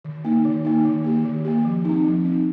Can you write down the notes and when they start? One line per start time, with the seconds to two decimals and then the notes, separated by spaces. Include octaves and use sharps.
0.05 D#3
0.25 A#3 D#4
0.45 D#3
0.65 A#3 D#4
0.85 D#3
1.04 A#3 G4
1.25 D#3
1.45 A#3 G4
1.65 F3
1.85 C4 D#4
2.04 F3
2.25 C4 D#4